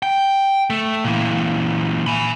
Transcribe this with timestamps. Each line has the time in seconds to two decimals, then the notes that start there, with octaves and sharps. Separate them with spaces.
0.03 G5
0.70 A3
1.05 A#2 E3
2.07 G#5 B5